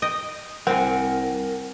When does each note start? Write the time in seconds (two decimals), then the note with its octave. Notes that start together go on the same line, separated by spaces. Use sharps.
0.02 D#5 G5
0.67 C2 C4 A#4 C5 F#5 G#5